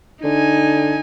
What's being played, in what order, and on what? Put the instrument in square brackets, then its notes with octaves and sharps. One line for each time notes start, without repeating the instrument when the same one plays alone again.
[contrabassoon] D3 [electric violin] D#4 G#5